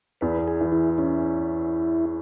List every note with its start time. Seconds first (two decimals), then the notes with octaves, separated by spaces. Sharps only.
0.21 E2 B4
0.48 G#4
0.61 E3
0.72 E4
0.98 C#4 E4